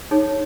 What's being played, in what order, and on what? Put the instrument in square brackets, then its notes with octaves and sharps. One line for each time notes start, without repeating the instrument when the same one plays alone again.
[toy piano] D#4 G#4 C#5